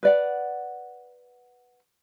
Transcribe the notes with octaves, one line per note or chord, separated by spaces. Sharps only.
B4 D5 F#5